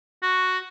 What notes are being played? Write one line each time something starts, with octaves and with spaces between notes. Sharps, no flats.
F#4